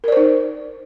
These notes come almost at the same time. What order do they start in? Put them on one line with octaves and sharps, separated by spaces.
A#4 D5 C5 D#4